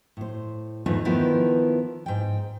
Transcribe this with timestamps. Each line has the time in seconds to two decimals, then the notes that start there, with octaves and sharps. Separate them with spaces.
0.17 A2 C5
0.86 E2 G#2 A3 D#4 F4 B4
1.05 D#3 F3 B3 E4 A#4
2.06 G#2 G5